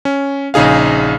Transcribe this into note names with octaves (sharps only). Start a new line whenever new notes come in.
C#4
A#1 C#3 D#4 G#4 F5